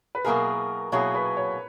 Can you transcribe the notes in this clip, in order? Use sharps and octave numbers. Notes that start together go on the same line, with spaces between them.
B4
B2 F#3 A#3 E4 G#4 A#4
B2 F#3 A#3 E4 G#4 C#5
B4
C#5